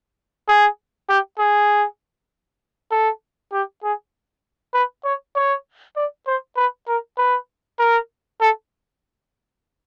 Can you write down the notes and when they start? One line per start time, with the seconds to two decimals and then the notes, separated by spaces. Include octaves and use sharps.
0.48 G#4
1.09 G4
1.39 G#4
2.91 A4
3.53 G4
3.83 G#4
4.74 B4
5.04 C#5
5.35 C#5
5.96 D5
6.27 C5
6.57 B4
6.88 A#4
7.18 B4
7.79 A#4
8.41 A4